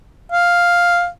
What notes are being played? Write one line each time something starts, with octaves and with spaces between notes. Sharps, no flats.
F5